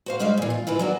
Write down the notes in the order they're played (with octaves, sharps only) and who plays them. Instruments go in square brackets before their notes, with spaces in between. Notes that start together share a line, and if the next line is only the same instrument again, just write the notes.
[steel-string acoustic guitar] F#4 C5 F5
G3 G#3 E5 F5
A#2 E3
F4
E3 E4 F4 B4
F#3 D4 F#4